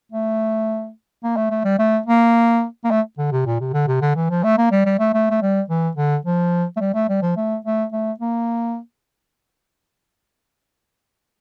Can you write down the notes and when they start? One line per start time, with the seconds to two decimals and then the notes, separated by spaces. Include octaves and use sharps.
0.12 A3
1.24 A#3
1.37 A3
1.50 A3
1.65 G3
1.79 A3
2.06 A#3
2.84 A#3
2.91 A3
3.18 D3
3.32 C3
3.46 A#2
3.61 C3
3.74 D3
3.87 C3
4.02 D3
4.15 E3
4.30 F3
4.43 A3
4.58 A#3
4.71 G3
4.86 G3
4.99 A3
5.14 A3
5.31 A3
5.42 G3
5.70 E3
5.97 D3
6.25 F3
6.77 A3
6.80 G3
6.94 A3
7.09 G3
7.22 F3
7.37 A3
7.65 A3
7.92 A3
8.20 A#3